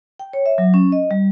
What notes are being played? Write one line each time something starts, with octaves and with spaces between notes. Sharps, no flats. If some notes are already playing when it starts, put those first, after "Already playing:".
G5
C#5
E5
F#3
C#4
D#5
G3